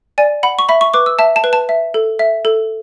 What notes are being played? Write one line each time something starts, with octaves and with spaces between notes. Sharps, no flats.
D5 G#5
F#5 B5
C#6
E5 B5
C#6
B4 D6
E6
E5 A5
A5
B4
A5
E5
A4
E5
A4